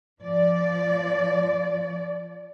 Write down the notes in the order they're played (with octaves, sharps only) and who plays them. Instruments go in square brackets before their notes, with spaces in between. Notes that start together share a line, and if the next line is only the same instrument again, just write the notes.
[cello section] F3 D5